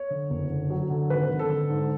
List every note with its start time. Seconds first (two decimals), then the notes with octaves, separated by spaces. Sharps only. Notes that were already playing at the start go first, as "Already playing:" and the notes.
Already playing: C#5
0.10 D3
0.30 F#1
0.50 D3
0.70 F#3
0.90 D3
1.10 G#1 B4
1.30 D3
1.39 A4
1.50 D3
1.69 G#2